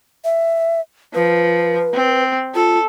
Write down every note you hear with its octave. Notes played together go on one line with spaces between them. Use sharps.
E5
F3 B4
C4
F4 A4